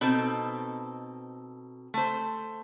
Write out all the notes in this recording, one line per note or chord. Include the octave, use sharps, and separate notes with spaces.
B2 C4 D#4 A4
A3 C5